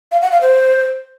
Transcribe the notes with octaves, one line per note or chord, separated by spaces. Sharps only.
F5
F#5
F5
C5